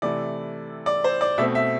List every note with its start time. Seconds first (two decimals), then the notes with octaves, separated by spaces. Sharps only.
0.02 C3 E3 A3 E4 D5
0.86 D5
1.04 C5
1.21 D5
1.38 B2 A3 C4 E5
1.55 E5